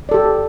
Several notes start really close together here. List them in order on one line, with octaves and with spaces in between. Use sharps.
D5 A4 G4